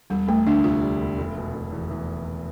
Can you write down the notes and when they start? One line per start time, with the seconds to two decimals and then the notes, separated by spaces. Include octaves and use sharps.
0.10 E1 G3
0.28 E1 A3
0.46 D2 D4
0.64 C3 F4
0.83 G3
1.00 E1
1.18 F1
1.37 B2
1.55 F1
1.72 E2
1.90 E2